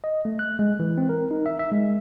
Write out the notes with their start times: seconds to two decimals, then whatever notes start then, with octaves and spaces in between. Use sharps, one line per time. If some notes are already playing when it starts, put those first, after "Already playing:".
0.04 D#5
0.25 A3
0.39 F#6
0.59 G#3
0.80 E3
0.98 C4
1.09 A#4
1.31 D#4
1.46 E5
1.59 E5
1.72 G#3